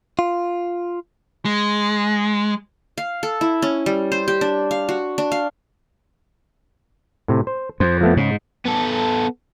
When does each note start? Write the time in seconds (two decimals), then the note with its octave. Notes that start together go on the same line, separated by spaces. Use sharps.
0.19 F4
1.45 G#3
2.98 F5
3.23 A4
3.41 E4
3.62 C#4
3.86 G3
4.12 C5
4.28 G4
4.41 D4
4.71 F5
4.89 F#4
5.18 D4
5.32 F5
7.28 A2 C3
7.47 C5
7.80 F2 C5
8.01 F3 A3 B3
8.17 G#2 C#3
8.66 B3 A4